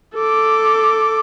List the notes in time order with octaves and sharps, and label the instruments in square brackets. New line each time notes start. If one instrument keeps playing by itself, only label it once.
[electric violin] A4 D6